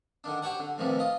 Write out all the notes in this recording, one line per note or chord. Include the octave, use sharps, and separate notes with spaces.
D3 D#3 D4
G4 C5 C#5 F#5
D3
F2 A2 C3 D#3 E3
F4 D#5